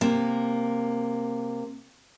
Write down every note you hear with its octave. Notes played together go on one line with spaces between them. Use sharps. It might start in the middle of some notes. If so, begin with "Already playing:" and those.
C3 A#3